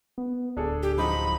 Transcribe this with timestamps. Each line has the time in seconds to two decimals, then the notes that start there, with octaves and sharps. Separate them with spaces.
0.18 B3
0.57 D1 D4 G#4 A4
0.83 G4
0.98 F3 F#3 D#4 B5